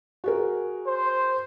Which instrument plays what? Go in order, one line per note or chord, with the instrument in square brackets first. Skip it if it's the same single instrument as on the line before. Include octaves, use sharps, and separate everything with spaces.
[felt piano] F#4 G#4 A#4
[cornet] C5